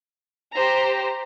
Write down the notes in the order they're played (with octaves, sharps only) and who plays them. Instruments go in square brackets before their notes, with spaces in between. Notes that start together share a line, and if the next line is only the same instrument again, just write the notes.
[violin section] G4 C5 A#5